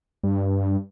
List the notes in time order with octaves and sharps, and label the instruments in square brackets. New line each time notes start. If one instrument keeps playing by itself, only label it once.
[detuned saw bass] G2